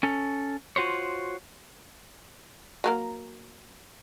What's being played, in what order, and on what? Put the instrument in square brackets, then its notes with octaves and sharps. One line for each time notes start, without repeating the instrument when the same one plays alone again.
[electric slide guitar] C#4 A4
F4 F#4 C5 C#5
[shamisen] F#3 A#3 A#4